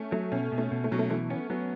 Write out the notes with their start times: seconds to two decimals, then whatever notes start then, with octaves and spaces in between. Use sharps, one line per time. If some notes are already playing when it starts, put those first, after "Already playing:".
Already playing: A3 C#4
0.12 F#3 A3
0.32 B2 C#4
0.52 B2
0.58 A3
0.71 B2
0.84 A3
0.91 B2 F#3
0.99 A3
1.10 E3 A3
1.30 B3 C#4
1.50 F#3 B3